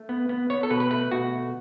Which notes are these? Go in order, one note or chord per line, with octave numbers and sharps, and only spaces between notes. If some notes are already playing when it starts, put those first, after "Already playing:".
Already playing: A3
B3
B3
B3 C#5
A4
B2 B4
B4
A3 B4
B2 F#4
A3